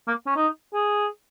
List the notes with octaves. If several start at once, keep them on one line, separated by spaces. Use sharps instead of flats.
A#3
C#4
D#4
G#4